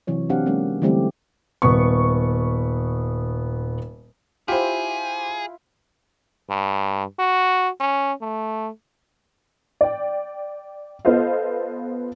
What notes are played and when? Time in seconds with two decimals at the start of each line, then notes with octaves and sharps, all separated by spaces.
0.07 C3 E3 F#3 C#5
0.29 F#3 C4 D4 G4 F5 F#5
0.46 F#3 G#3 A#3 C#4
0.82 D3 E3 G3 A3 C4 G4
1.62 D#1 B3 C#6
4.48 E4 F4 G4 G#4 C5
6.50 G2
7.19 F#4
7.80 C#4
8.21 A3
9.81 D5 G5
11.05 B3 F4 A4 C5 D#5 F5